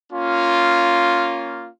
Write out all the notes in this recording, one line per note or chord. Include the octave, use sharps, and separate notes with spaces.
A#3 C#4 F4